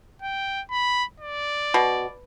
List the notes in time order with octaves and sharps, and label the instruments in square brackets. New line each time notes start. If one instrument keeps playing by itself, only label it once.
[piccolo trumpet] G5
B5
D5
[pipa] B2